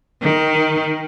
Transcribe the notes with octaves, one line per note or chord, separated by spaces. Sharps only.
D#3